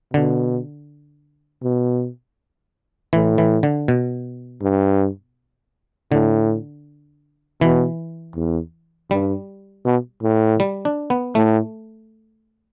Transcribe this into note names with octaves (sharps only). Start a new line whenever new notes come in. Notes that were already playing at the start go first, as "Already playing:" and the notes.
B2 D3
B2
A2 E3
E3
D3
B2
G2
A2 D3
B2 E3
E2
G2 G3
B2
A2
G3
D4
B3
A2 A3